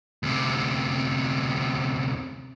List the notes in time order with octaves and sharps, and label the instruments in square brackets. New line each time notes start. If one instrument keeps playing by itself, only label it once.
[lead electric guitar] D2 C3